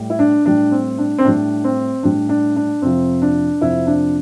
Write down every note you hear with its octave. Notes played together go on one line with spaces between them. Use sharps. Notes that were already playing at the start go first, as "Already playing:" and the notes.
Already playing: A2 G3
E4
D4
A2 G3 D4
C4
D4
C4
A2 G3 D4
C4
A2 G3 D4
D4
D4
F2 C3 F3 C4
D4
F2 C3 F3 E4
D4